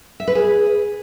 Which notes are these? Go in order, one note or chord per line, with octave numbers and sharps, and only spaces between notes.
E5
B4
G#4